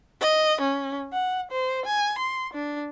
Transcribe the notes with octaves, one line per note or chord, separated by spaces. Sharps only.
D#5
C#4
F#5
C5
G#5
C6
D4